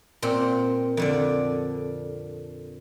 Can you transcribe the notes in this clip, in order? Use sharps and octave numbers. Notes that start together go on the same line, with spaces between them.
A#2 C4
F2 D3 D5